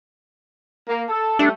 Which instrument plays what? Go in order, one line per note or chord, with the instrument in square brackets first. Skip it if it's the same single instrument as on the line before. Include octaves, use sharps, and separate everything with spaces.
[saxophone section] A#3
A4
[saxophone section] G3 A3 [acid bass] D4